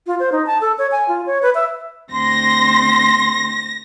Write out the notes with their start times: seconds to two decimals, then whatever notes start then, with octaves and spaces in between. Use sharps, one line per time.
0.07 F4
0.20 C5
0.32 D#4
0.47 A5
0.61 A4
0.78 C#5
0.92 G#5
1.08 F4
1.26 C#5
1.42 B4
1.55 E5
2.13 D2 C4 C6 A#6